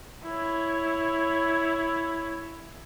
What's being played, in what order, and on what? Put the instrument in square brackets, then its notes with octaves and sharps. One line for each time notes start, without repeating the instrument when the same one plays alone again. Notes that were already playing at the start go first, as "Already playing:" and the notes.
[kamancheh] E4 C#5